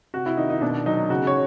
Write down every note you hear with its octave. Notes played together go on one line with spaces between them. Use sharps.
C3 F#4
E4
D#3 D#4
D#4
B2 D4
F#3 D#4
C#3 F#4
C#5